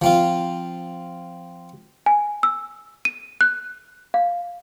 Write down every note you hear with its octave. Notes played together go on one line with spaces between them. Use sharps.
F3 C4 F4
G#5
E6
D#7
F#6
F5